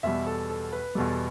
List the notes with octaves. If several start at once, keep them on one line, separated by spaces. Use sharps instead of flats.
E2 B2 G3 E5
A4
A4
B4
E2 B2 G3 A4